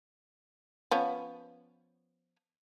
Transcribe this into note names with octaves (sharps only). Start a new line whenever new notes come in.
F3 B3 C#4